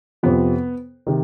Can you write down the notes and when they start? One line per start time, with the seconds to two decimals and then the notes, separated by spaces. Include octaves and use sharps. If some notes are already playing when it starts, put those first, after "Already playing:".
0.23 F2 C3 F3 B3
1.07 C3 D#3